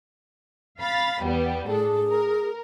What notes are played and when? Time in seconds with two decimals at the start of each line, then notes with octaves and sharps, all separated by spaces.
0.80 F5 B5 A6
1.23 E2 G3 B3
1.68 A2 D4 G#4 A4
2.08 A#4